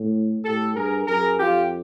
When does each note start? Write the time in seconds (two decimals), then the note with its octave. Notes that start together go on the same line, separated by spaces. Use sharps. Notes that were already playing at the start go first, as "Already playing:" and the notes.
Already playing: A2
0.44 A2 G4 A4
0.76 G2 G#4 A#4
1.07 F#2 G#4 A#4
1.39 F2 F4 G4